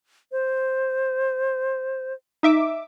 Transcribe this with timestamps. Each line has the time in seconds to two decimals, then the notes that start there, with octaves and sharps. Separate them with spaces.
0.32 C5
2.43 D#4 E5 D6